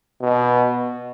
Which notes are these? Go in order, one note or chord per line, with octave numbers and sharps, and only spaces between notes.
B2